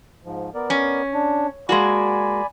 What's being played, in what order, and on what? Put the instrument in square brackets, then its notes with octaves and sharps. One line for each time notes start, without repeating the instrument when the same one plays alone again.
[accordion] G#2 F3
B3 A#4 D5
[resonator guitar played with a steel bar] C#4
[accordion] D4
[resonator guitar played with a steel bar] G#3 A#3 F#4 [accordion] D5 G#5 B5